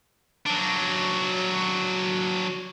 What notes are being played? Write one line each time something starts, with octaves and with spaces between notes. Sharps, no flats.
F#3 D4